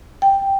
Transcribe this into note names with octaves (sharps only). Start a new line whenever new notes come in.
G5